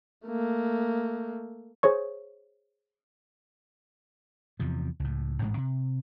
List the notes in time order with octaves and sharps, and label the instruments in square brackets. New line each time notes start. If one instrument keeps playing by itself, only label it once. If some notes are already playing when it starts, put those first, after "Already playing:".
[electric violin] A3 A#3
[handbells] G#4 C5 C#5 C#6
[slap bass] E2 C3 F3
C#2 A2
A1 G#2 G#3
C3